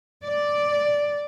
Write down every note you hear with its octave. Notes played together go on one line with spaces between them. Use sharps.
D5